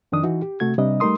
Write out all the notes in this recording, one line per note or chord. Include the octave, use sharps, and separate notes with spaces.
F2 D#3 D4 D#6
E3 D#4 F#4
G4
C3 A3 F#4 G#6
C3 G3 D4 D#5
G3 A3 D#4 A#4 C6 D#6